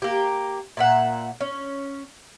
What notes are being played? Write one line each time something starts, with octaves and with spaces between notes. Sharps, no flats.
A#3 G4
A#2 E5 F#5
C#4